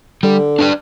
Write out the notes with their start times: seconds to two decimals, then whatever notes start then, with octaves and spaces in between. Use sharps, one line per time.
0.23 D3 G3
0.59 D4 B4 D5